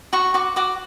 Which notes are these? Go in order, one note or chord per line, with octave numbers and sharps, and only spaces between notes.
F#4 C#6
F#4 D6
F#4 D6